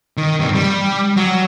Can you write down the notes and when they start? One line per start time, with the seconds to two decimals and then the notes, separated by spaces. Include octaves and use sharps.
0.17 D#3
0.40 G2 C3
0.55 G3
1.16 F#3